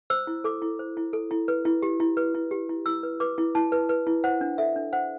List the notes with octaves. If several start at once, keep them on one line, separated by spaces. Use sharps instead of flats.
C5 E6
E4
A4 D6
E4
C5
E4
A4
E4
B4
E4
G4
E4
B4
E4
G4
E4
E4 E6
B4
B4 D6
E4
E4 A5
B4
B4
E4
C5 F#5
D4
A4 E5
D4
C5 F#5